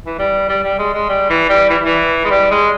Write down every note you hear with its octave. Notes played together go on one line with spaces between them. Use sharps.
E3
G3
G3
G3
G#3
G#3
G3
E3
G3
E3
E3
G#3
G3
G#3